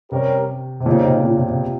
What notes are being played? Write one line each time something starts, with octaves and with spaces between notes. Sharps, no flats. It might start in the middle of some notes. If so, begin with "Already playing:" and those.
C3 G3 C#4 G4 A#4
C3
A#2 C#3 G3 C4 D#4
C3
A#2
C3
C3